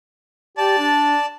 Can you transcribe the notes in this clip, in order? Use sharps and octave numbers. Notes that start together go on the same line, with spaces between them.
G4 D5 A5
D4